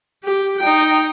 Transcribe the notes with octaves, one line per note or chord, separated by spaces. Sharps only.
G4
D#4 G5